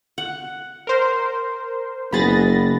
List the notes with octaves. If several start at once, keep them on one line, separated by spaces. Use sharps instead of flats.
F#5
A#4 C5
F#1 B3 G#4 B5 A6 A#6